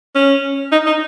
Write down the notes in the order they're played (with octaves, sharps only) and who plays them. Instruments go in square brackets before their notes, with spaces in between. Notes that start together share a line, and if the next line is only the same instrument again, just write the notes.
[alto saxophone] C#4
D#4
D#4